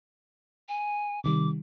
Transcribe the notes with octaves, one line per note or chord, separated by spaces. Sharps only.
G#5
C3 D#3 G3 D6